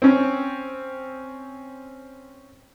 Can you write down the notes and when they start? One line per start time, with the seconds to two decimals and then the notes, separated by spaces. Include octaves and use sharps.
0.02 C4 C#4